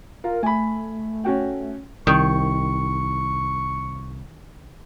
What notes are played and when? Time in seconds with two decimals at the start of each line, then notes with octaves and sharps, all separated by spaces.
0.24 F4 A#4
0.43 A3 G#5 B5
1.24 C#4 F#4 G5
2.07 C2 D#3 C#6